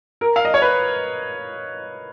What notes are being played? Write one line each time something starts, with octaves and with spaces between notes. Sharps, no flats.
A#4
F5
D#5
C#5
B4